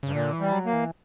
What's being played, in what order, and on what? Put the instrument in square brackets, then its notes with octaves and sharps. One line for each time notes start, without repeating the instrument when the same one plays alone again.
[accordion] G2 [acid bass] C#3
[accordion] A#2 [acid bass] D3
[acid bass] E3
[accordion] G3
[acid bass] F#3
[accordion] A#3
[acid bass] E3